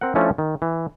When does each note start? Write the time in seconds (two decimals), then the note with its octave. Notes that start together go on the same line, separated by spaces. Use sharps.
0.01 C4 A#4 F#5
0.15 F3 A3 C#4 D4 E4
0.38 D#3
0.62 E3